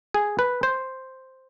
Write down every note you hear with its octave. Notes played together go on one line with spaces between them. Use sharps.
G#4
B4
C5